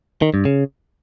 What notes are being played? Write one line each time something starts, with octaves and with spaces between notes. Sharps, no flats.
D#3
G2
C#3